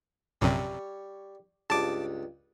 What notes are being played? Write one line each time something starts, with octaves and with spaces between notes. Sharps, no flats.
A#1 F#2 C3 G3 C#5
C#2 G2 A5 D6